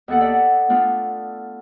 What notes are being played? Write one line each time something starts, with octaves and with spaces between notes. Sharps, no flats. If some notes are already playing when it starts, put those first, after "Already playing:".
D#2 B3 A4 F#5
D5 E5 F#5
A3 B3 D4 F4